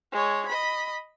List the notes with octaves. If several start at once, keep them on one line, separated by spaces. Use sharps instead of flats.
G#3 C#5
D#5 B5